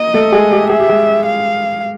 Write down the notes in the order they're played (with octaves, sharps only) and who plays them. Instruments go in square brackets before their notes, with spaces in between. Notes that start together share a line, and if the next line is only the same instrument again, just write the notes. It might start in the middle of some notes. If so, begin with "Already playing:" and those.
Already playing: [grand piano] A#3 [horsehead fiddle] D#5
[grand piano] A3 A4
G#3 G#4
G4
[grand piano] G#4 [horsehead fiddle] E5
[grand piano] G4
G#3 G#4
[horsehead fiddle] F5